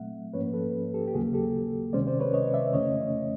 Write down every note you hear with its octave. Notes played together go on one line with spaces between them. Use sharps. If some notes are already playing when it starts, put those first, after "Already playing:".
Already playing: A#2 F#3 A3 C4 E5 F#5
G#2 F3 A#3 C#4 B4 C#5
A4 B4
G4 A4
G4
D#2 C#3 F#3 A#3 F#4 G#4
G4 A4
C#2 C3 D#3 G#3 C#4 C5 D5
C5 D5
B4 C#5
C#5 D#5
D5 E5
F2 C#3 E3 A3 C#4 C#5 D#5